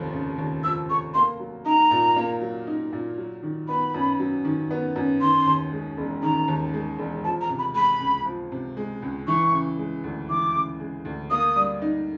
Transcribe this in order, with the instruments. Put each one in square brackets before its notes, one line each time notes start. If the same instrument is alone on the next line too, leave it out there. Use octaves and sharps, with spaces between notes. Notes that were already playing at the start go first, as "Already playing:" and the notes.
Already playing: [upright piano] F1 D#2 F3
C#3
D#2
[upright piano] F3 [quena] E6
[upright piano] F1 [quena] C#6
[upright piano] A#3 [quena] C6
[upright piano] F#3
[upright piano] D#4 [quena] A#5
[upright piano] A#2
A#3
F#3
D#4
A#2
F#3
D#3
[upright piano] B3 [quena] B5
[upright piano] F#2
F#3
D#3
B3
F#2
[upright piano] D#3 [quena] C6
[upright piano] D#2
G#3
E1
[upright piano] D#3 [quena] A#5
[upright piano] D#2
G#3
E1
[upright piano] F3 [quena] A5
[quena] A#5
[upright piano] C3
[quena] B5
[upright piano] G#3 [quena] B5
[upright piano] C#2
F3
C3
G#3
C#2
[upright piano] E3 [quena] C#6
[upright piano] C#3
G#3
D2
[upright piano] E3 [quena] D6
[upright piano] C#3
G#3
D2
[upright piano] A#3 [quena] D#6
[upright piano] G3
D#4